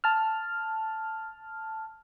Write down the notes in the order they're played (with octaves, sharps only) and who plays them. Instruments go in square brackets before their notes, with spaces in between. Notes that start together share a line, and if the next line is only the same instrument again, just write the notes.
[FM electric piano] A5 F6